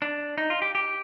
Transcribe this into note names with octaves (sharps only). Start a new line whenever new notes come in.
D4
D#4
F4
G4
G4